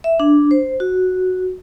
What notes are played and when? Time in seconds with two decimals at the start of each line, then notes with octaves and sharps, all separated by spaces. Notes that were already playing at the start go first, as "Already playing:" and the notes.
0.04 E5
0.20 D4
0.51 C5
0.80 F#4